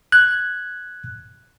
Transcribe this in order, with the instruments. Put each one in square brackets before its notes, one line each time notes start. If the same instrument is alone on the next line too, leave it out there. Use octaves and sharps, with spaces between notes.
[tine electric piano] F#6 G#6